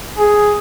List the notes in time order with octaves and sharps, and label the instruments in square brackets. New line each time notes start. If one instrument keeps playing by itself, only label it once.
[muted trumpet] G#4